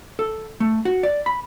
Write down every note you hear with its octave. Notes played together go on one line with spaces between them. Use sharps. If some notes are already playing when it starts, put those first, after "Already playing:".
A4
A3
F#4
D5
B5